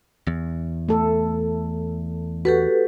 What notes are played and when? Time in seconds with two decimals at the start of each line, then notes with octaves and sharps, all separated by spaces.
0.27 E2
0.89 A3 A4
2.45 F#4 G4 A4 B4